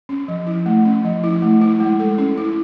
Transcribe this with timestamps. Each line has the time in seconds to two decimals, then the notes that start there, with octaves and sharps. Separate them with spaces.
0.09 C#4
0.28 F3
0.47 E4
0.66 A3
0.85 C#4
1.04 F3
1.24 E4
1.42 A3
1.61 E4
1.80 G#3
2.00 A4
2.18 C#4
2.38 E4